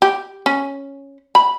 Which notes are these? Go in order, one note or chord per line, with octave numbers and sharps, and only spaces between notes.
G4
C#4
B5